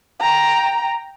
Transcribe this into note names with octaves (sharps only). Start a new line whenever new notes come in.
G5 A#5